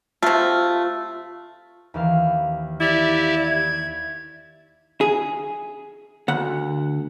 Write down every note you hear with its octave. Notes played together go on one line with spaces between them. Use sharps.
C3 A3 F4
D#2 E3 F5
E4 G4 D5 E5
G#6
G#4
D2 F#5